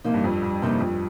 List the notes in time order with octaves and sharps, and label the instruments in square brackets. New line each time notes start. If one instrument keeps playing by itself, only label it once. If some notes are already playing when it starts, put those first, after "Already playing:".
[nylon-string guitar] C3 F3 A#3 D#4
[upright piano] G2
F2
G2
[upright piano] G2 [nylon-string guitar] C3 F3 A#3 D#4
[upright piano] F2